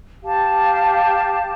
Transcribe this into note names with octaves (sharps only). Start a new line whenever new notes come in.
G4 F5 A5